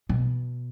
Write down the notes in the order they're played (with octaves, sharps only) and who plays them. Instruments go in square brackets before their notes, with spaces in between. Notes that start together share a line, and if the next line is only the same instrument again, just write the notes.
[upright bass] B2